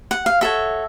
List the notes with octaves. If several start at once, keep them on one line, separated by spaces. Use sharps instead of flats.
F#5
F5
F#4 A4 C#5 E5